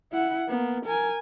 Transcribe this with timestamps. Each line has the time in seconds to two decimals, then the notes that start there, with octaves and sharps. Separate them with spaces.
0.12 E4 F#5
0.48 A#3 B3
0.86 A#4 G#5